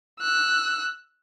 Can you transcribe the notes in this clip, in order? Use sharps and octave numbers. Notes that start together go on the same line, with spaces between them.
E6 F#6